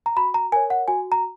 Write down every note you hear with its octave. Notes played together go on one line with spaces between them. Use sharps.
A#5
F#4 B5
A#5
A#4 C#5 G#5
F#5
F#4 G#5
A#5